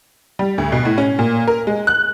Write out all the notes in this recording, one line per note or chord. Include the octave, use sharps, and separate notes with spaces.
G3
D2
B2
A2
C#4
A#2
A#4
G#3
F#6